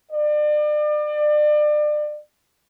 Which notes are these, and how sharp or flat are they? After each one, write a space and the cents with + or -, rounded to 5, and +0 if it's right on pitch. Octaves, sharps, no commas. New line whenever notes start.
D5 +35